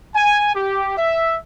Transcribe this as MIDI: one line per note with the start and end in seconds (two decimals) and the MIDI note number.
0.15 0.51 80
0.55 0.96 67
0.97 1.36 76